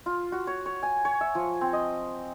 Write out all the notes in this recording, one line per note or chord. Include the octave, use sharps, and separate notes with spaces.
F4
F#4
C#5
C#5
G#5
C#5
E5
F3
C4
D#5